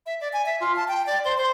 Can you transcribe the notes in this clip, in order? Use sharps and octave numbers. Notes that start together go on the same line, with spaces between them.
E5
D5
G#5
E5
F4
A5
G5
D5
C5
C5